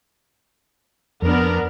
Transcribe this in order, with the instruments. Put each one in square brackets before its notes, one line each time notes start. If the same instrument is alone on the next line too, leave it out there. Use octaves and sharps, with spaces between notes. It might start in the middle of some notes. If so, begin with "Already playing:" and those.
[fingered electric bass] F2 [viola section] B3 D4 A#4